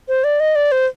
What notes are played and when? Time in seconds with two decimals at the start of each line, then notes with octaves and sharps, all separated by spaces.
0.08 C5
0.24 D5
0.40 D#5
0.56 D5
0.72 C5